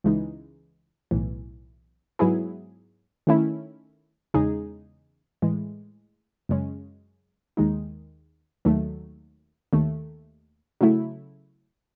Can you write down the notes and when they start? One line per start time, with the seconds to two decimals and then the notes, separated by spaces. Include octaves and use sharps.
0.04 C#2 C#3 E3 G#3 D#4
1.11 B1 A2 E3
2.19 G#2 F#3 B3 E4 G#4
3.27 D#3 A3 C#4 E4
4.34 E2 C#3 G#3 D#4 G#4
5.42 A2 E3 G#3
6.49 F#2 C#3 G#3 C#4
7.57 D#2 D#3 G#3 D#4
8.65 D#2 D#3 F#3 A3
9.73 D#2 D#3 A3
10.81 C#3 F#3 A3 E4